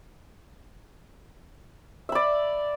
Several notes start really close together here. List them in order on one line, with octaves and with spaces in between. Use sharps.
E5 B5 D5